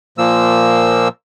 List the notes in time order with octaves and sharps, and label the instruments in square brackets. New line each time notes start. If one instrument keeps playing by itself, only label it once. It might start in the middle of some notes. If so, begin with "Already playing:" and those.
[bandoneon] A#2 F3 A#3 E6